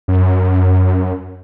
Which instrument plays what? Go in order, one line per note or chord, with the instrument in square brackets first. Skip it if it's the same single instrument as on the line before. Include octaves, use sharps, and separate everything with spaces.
[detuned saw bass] F#2